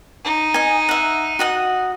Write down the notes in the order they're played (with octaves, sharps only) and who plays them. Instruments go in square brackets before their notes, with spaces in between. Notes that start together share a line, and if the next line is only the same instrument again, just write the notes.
[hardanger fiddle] D#4
[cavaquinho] D#5 G#5
E5 F#5
F#4 D#5 F#5